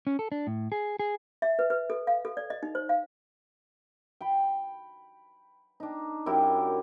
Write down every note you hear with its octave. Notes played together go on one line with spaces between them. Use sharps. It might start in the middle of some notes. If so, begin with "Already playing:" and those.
C#4
A4
D4
A2
G#4
G#4
E5
B4
B4
A4
F5
A4
D5
D#5
D#4
C5
F5
G5 B5
D4 D#4
F#2 E4 G4 A#4